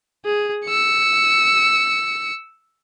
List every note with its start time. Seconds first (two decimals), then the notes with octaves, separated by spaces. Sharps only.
0.25 G#4
0.66 E6 C#7